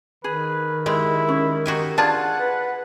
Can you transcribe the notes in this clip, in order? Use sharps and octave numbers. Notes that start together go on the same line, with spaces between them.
D#3 G#4 B4
G#3 E4 G4
C#4
D#4 F#4 G4 G#5
D4 F4 G#4 F#5 A5
B4